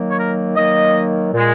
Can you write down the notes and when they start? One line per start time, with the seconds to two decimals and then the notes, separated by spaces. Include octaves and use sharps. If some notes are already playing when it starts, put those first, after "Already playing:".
Already playing: D#3 F#3 A#3
0.10 C#5
0.19 A#4
0.56 D#3 F#3 A#3 D#5
1.33 A#2 G#3